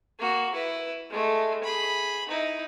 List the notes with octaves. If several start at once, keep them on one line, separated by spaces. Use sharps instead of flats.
A#3 F#4
E4 B4
G#3 A3
G#4 B5
D#4 E4